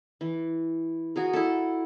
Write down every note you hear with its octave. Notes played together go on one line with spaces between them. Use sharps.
E3
F#4 G#4 A#4
E4 A4